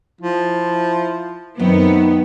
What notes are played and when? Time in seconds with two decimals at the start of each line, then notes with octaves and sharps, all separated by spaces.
0.21 F3 E4
1.59 F#2 D#3 B3 C4